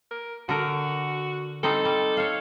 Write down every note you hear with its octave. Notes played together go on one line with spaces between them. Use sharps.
A#4
D3 F#4 A#4
G3 C4 D#4 A4
G3
C#5 F5